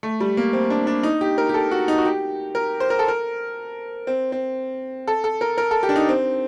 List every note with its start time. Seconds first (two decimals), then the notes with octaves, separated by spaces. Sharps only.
0.03 A3
0.20 G3
0.37 A#3
0.53 C4
0.70 D4
0.87 D4
1.03 D#4
1.21 G4
1.38 A#4
1.49 G4
1.54 A4
1.71 F#4
1.88 D#4
1.98 F#4
2.05 G4
2.55 A#4
2.80 C5
2.90 A#4
2.99 A4
3.08 A#4
4.07 C4
4.32 C4
5.07 A4
5.24 A4
5.41 A#4
5.58 A#4
5.71 A4
5.83 G4
5.89 D4
5.96 D#4
6.09 C4